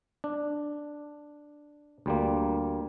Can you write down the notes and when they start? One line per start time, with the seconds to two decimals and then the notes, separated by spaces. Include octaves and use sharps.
0.24 D4
2.06 D2 G3 A#3